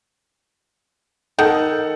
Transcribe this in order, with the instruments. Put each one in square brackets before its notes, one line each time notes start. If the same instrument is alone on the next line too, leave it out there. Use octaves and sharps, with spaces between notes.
[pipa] D#3 [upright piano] A4 F#5